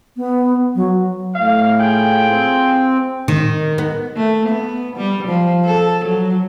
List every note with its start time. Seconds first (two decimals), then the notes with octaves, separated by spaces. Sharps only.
0.17 B3
0.75 F#3
1.35 A2 F5
1.80 F4 G#4 G5
2.28 C4
3.28 D#3
3.78 B3
4.16 A3
4.49 B3
4.97 G3
5.28 F3
5.65 A4
6.05 F#3